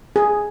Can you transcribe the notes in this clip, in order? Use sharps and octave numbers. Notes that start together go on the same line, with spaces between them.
G#4